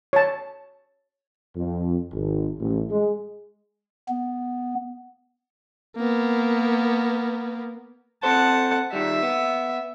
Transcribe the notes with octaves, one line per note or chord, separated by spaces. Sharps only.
C#5 A5
F2
G#1
A1
G#3
B3
A#3 B3
C4 A4 C5 F#5 A5
D#3 G3 E5
B3